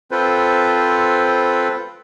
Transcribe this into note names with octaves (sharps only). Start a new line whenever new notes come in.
C4 F4 A4 B4 C5